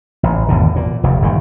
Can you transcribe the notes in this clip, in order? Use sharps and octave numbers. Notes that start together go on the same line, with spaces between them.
A1
G#1 E2 B2 D3
A#2
F1 D#2
G1 A#2 D#3